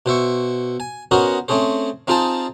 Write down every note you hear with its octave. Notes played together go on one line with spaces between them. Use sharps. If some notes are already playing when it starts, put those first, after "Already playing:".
B2 C5 E5 C#6
G#5
B3 C#4 F#4 A#4 C5 D#5
A3 C4 C#4 G#4 C5
C4 D#4 F4 G#4 C5 A5